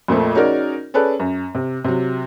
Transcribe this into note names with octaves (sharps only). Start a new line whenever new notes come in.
F2 A#2 F3 A3
C#4 D#4 F#4 G#4 A#4 D5
C#4 G#4 A4 B4 D5
F#2
C3
C3 F#3